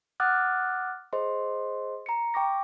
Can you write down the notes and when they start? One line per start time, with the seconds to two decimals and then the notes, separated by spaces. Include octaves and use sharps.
0.20 F#5 D6 D#6 F6 F#6 A6
1.13 G#4 C5 D#5 C6
2.06 A#5 C#7
2.34 G5 C#6 D6 A#6